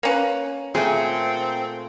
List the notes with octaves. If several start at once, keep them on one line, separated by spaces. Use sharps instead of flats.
A#3 C#4 B4
A#2 A3 C4 G#4